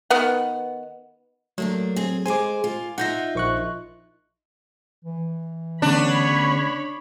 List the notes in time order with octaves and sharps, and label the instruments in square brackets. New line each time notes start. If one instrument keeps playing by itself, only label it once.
[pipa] D#3 B3 F#5
[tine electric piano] F#3 [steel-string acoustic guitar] A3 A#3 D4
[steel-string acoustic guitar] C4 G#4
[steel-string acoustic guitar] G#3 G#4 C5 [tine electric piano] G#5 D6
[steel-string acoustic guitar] F4
[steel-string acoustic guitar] D#4 F4 E5 [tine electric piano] F#5 G6 A#6
[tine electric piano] A#1 C#6 F#6
[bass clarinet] E3
[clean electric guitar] D2 C#3 B3 [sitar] D4 [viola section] C#5 B5